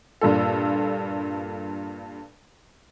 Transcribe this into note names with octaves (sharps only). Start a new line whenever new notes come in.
G2 A#2 A4